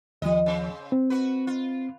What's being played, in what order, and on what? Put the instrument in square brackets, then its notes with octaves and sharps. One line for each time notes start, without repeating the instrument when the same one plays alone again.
[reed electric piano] D#2 F3 [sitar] G3 D#5
[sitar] C#3 C4
[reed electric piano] C4
[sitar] F#4 B4
F4